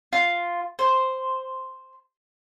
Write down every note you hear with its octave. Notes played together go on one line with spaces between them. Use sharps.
F4
C5